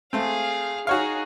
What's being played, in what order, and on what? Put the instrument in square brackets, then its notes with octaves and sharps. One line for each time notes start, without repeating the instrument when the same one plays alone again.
[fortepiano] A3 C4 [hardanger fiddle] G#4 F5
[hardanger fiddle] D#4 G#4 [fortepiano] F#4 C#5 F5